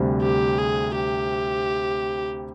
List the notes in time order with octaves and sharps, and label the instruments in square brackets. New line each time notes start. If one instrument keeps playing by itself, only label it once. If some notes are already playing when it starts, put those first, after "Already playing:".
Already playing: [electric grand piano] D2 C3 G3
[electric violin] G4
G#4
G4